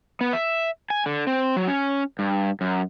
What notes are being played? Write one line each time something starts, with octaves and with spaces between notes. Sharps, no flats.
B3
E5
G#5
D3
C4
F#3
C#4
G2
F#2